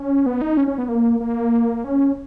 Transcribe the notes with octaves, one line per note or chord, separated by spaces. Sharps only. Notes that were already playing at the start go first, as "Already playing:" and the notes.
Already playing: C#4
B3
D#4
C#4
C#4
B3
A#3
A#3
C#4